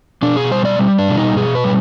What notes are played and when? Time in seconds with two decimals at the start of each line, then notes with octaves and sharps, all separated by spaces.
0.22 B2 D4
0.36 G#4
0.51 G3 C5
0.65 D5
0.79 G3
0.98 D4
1.08 B2
1.17 D#4
1.36 B2 G#4
1.55 B4
1.64 G3